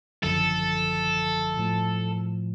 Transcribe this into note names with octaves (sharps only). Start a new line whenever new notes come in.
G#1 F#2 D3 F3 A4
A2 F3 A3